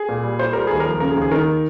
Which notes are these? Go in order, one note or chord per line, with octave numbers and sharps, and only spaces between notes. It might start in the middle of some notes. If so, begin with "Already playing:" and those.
Already playing: G#4
A#2
G3
F4 C5
G3 A#4
D#2 G#4
A#4
F3
C#3 A#4
G#4
D#2
G#4
D#3 A#4